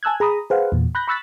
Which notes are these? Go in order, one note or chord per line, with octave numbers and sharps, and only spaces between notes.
G#5 A5 E6 F#6 G#6
G#4 A#5 B5 D#6
G#4 B4 C5 F5 F#5
E2 A#2
B5 F#6 G6 A#6
B5 C#6 E6 F#6 A6 B6